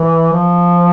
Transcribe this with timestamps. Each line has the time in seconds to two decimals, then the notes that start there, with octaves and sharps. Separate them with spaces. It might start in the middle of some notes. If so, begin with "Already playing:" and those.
Already playing: E3
0.33 F3